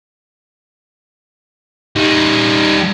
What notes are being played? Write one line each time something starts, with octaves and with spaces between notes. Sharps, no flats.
G3 D#4